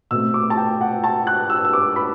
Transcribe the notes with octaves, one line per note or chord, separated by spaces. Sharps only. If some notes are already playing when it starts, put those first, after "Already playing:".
B2 A3 C4 E6
D6
A5
G5
F#5
A5
F#6
E6
E6
D6
B5